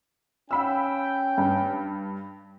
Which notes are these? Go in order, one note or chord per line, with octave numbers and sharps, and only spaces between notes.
C#4 F5 G5 B5 E6
G2